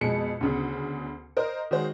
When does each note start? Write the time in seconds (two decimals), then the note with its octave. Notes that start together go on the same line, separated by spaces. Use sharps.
0.01 F2 B2 G#3 C#7
0.41 D2 C#3 B3
1.37 A#4 C5 D#5
1.71 D#3 G#3 F#4 C5